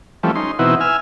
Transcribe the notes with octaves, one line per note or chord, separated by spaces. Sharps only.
E3 F3 G3 A3 C4 C#4
C#4 D#4 C6
B2 E3 C4 D#4 E4 F#4
E5 G#5 F6